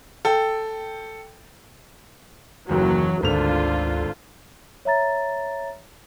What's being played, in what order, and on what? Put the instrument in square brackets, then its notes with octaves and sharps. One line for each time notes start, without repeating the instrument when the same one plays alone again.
[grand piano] A4 G5
[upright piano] F#1 D#2 [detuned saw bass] E3 [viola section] F#3
[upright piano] G#1 F7 [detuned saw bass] D2 [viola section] D3 F4
[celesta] C#5 E5 A#5 A6